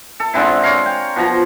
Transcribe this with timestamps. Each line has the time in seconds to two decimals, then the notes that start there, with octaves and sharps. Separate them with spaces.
0.20 A4
0.34 D3 G#3 C4 E4
0.62 C#5 F5 A#5
0.86 G5
1.16 B2 F3 A#5